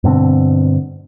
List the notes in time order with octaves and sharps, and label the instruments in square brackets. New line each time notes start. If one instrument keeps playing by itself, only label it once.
[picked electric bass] G2 B2 D3 C4